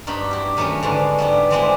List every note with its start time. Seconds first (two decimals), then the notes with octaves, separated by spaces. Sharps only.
0.07 G2 D#4 F#4 B5
0.31 E4 G4
0.57 D#3 F#3 A3 B3 C#4 F#4
0.83 G#2 D3 G#3
1.18 G3 B3 E4
1.50 E3 G#3 B3 C4 D4 E4